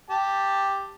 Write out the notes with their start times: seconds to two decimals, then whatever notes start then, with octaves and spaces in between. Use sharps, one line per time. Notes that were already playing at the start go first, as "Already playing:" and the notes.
0.10 G4 A5